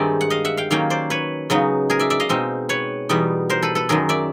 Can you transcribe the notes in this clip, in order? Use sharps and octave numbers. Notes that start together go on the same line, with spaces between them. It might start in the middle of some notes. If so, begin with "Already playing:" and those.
Already playing: G2 D#3 G#3 C4 D#4 D5 E5
F#5
D#5 F5
E5 F#5
F5 G5
D#3 F#3 A#3 C#4 F5 G5
C5 D5
B4 C#5
C#3 F#3 B3 D#4
G#4 A#4
D5 E5
D5 E5
D#5 F5
B2 G#3 C4 D#4
B4 C#5
E2 B2 G3 B3 D#4
A#4 C5
A4 B4
A4 B4
F#2 D#3 F#3 G#4 A#4
D5 E5